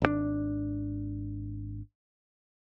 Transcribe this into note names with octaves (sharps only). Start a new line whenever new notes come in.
G#1 C3 D4